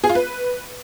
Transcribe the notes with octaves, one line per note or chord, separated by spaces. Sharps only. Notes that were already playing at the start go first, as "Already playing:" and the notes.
G#4
F4
B4